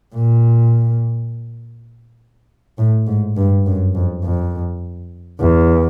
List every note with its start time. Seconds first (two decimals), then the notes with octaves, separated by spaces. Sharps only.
0.15 A#2
2.78 A2
3.07 G#2
3.36 G2
3.66 F#2
3.95 F2
4.24 F2
5.40 E2